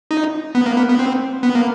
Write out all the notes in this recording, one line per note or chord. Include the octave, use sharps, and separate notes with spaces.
D#4
B3
A#3
B3
B3
C4
B3
A#3